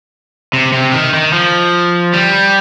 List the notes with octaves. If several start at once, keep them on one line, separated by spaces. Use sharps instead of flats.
C3
C3
D#3
D#3
F3
G3